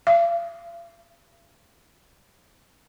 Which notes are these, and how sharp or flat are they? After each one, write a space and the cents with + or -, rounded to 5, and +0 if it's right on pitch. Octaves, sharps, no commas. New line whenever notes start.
F5 -40